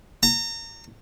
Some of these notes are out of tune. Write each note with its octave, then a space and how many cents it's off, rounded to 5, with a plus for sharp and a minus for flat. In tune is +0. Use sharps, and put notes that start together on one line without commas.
A#5 -35